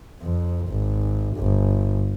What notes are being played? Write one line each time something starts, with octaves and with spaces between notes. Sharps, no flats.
F2
G#1
G1